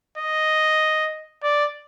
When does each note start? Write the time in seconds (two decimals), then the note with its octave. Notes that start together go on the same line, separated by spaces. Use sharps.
0.18 D#5
1.43 D5